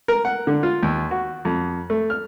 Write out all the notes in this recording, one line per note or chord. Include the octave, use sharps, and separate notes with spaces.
A#4
F#5
D3
F4
D#2
F#4
F2
A3
F6